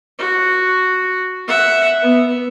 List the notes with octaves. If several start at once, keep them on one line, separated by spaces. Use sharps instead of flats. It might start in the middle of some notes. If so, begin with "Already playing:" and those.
F#4
E5 F#5
B3